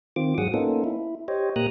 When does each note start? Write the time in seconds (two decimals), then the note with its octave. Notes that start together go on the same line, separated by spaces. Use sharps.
0.16 D#3 C4 F4 D6
0.38 G#2 F#3 G#4 F#5 D#6
0.54 A#3 B3 C#4 D#4 F4 A4
0.84 E4
1.28 G4 C5 C#5 D#5
1.56 A#2 A#3 G4 A#5 D#6 F#6